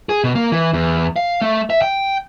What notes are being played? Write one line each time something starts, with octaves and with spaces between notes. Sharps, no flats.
G#4
B2
A#3
E3
E2
F5
A3
E5
G5